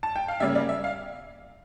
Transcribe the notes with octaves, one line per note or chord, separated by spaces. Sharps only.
A5
G5
F5
C#3 G3 A#3 C#4 E5
D5
E5
F5